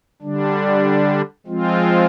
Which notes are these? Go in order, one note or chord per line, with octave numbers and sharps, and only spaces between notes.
D3 G3 D4
F3 G#3 C4 F4